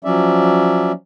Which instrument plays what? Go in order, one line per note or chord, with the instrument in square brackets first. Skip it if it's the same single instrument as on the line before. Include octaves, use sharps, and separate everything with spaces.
[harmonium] F3 F#3 C#4 D5 E5